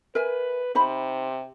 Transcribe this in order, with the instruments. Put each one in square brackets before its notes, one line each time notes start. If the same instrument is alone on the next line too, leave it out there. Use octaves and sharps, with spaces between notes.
[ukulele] A#4 E5 G#5 [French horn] B4
[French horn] C3 [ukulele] D#4 C5 B5